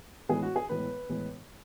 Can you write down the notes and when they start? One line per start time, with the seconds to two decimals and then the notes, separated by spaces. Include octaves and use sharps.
0.29 A2 E3 G#3 B3 G#4
0.42 F#4
0.56 G#4
0.69 A2 E3 G#3 B3 B4
1.09 A2 E3 G#3 B3